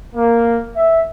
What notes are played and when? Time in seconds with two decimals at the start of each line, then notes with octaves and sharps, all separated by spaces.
0.15 A#3
0.76 E5